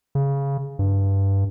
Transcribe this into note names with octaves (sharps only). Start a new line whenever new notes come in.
C#3
G2